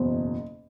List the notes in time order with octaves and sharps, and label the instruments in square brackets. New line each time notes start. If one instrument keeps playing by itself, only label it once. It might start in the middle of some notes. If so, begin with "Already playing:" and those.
Already playing: [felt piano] F#1 E2 B2 C5